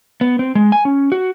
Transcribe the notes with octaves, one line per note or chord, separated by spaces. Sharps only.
B3
C4
G#3
G#5
C#4
F#4